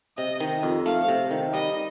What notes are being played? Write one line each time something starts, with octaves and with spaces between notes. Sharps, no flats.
C3 D#5
D#3
F2
A3 F5
C3
D#3
G3 D#5